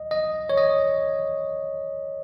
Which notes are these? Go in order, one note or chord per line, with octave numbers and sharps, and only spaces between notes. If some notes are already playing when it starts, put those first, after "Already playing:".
Already playing: D#5
D#5
C#5
D#5